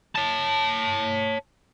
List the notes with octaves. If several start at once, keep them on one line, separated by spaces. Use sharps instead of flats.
C#5 A5